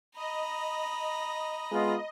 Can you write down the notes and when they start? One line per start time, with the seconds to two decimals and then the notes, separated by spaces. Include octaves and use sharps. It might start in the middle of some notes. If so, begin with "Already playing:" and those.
0.16 D#5 A#5 B5
1.72 G#3 B3 F4